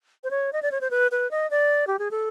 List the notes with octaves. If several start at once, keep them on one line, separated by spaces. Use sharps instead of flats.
C5
C#5
D#5
D5
C#5
C5
B4
B4
D#5
D5
G4
G#4
A4